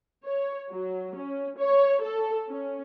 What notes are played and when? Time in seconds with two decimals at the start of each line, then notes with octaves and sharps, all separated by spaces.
0.24 C#5
0.71 F#3
1.15 C#4
1.58 C#5
2.02 A4
2.49 C#4